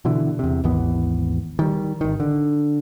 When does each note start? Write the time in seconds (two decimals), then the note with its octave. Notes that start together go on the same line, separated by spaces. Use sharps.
0.05 B2 D3 E3
0.39 E2 C3
0.64 G#1 D#2 E3 B3
1.59 D#3 G3
2.01 G#1 D#3
2.20 D3